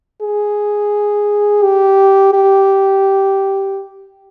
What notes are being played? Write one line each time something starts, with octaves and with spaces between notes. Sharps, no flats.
G#4
G4
G4